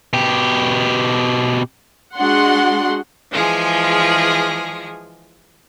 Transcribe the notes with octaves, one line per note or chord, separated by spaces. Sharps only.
B2 G4
G#3 D4 F#4 F#5 C6
E3 F3 G#3 G#4